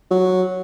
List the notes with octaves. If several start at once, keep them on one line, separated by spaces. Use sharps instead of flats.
F#3